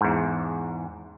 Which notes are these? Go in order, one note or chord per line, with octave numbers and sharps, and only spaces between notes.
E2 G#2